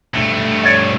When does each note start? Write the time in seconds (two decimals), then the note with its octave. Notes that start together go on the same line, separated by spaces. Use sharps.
0.14 G2 A3
0.64 C#5 D5